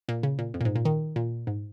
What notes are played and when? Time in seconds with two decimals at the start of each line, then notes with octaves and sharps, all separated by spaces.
0.09 A#2
0.23 C#3
0.39 A#2
0.54 F2
0.61 A#2
0.65 G#2
0.75 A#2
0.85 D#3
1.16 A#2
1.47 G#2